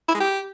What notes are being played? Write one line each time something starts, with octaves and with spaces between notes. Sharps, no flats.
E4
G#3
G4